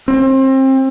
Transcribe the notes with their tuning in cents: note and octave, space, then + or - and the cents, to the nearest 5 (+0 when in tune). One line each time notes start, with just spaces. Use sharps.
C4 +30